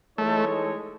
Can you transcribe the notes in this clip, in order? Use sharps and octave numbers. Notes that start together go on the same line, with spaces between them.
E3 G#3 A3 D#4 A4 C#5